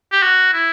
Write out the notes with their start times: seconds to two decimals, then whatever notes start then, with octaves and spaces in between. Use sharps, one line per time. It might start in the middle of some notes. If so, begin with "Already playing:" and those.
0.12 G4
0.22 F#4
0.53 E4